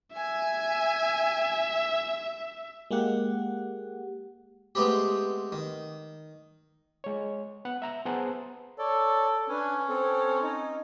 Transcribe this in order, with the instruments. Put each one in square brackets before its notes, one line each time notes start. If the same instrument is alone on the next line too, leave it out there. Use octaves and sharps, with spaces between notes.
[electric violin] E5 [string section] G#5
[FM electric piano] G#3 A#3 G4 F#5
[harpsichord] G#3 A3 B3 C4 G4
D#3
[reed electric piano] G#3 C#5
B3 F#5
E5 A#5 E6
B3 G#4 C5 F#5 A5 A#5
[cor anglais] A4 [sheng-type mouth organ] C#5 D5
[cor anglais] C#4 [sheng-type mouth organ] D4 B4 G#5
[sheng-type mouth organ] C4 A4
D#4